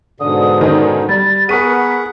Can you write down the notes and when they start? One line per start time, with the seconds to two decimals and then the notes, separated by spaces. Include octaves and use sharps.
0.20 G#2 B2 D3 D#6
0.61 D#3 C#4 D#4
1.09 G3 A6
1.49 B3 G#4 A#4 F#5 C#6 B6 D#7